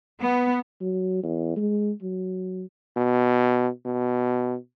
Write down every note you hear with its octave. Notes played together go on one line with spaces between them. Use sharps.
B3
F#3
E2
G#3
F#3
B2
B2